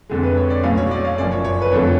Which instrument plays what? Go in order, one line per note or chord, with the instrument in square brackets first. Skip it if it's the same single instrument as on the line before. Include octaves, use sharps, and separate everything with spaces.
[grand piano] F2 D3 G#3
B4
C#5
D5
B1 A2 F#3 C#4 F5
C#5
D5
F5
F#1 F#2 F3 D5
C#5
C#5
B4
F2 D3 F3 A3 C#5